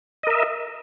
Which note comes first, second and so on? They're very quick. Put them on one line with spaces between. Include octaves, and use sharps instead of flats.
D#5 A#4 E5